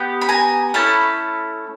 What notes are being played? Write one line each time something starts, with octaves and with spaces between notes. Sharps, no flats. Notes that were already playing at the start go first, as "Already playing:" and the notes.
Already playing: B3 G4
B5
G#5 A#5
A3 C#4 E4 A5 B5